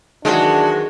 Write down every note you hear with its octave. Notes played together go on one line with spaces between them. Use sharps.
D#3 E3 F#3 G#3 D4 F#4